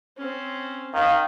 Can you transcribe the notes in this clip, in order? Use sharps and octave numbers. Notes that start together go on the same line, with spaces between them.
C4 C#4
D#3 F5